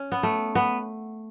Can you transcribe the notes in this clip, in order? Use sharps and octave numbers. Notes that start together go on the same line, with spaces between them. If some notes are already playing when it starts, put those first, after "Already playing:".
Already playing: C#4
B3
A3
B3